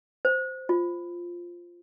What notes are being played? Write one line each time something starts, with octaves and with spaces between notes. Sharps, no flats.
C5
F4